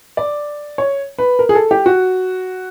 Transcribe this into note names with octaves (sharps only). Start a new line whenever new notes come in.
D5
C#5
B4
A#4
G#4
A4
G4
F#4